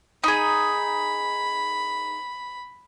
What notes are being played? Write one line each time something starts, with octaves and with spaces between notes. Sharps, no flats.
D#4 G#4 B5